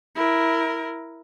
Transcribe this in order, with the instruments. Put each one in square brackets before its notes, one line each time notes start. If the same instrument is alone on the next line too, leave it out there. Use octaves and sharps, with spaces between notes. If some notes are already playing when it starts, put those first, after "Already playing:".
[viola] E4 A#4